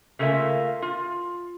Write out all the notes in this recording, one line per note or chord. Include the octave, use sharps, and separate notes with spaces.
C#3 A3 A#3 F4 E5 G#5
F4